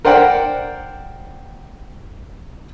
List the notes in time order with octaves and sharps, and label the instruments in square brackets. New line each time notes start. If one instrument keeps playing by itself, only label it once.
[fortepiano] A#4 C5 D5 F#5 G5